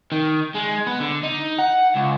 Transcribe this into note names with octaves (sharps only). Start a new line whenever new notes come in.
D#3
G#3
B3
D3
D#4
F#5
C#2